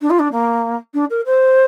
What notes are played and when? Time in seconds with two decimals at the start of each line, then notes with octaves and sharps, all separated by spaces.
0.02 D4
0.10 F4
0.19 D4
0.32 A#3
0.94 D4
1.10 A#4
1.26 C5